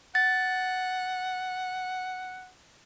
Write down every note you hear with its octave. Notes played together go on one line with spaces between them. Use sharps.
F#5 A6